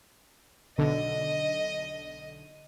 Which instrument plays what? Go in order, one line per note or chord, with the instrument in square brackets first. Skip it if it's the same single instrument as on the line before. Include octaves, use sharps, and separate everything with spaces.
[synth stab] B1 D3 [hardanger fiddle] D#5